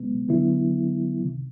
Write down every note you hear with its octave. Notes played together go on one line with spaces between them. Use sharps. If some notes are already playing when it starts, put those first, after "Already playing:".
Already playing: C2 B2 G#3 B3
D2 D3 F#3 B3 E4
C#2 C3 D#3